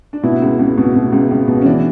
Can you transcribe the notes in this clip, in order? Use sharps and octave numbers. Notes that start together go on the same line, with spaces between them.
D4
B2 E4
C#2
C#2
B2
B2
C#2
C#2
B2
C#4
E3 D4